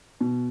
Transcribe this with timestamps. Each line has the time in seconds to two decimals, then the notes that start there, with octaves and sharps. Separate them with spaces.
0.21 B2